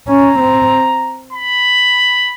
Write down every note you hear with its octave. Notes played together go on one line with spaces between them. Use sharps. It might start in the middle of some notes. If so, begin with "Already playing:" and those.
C#4 A#5
C4
B5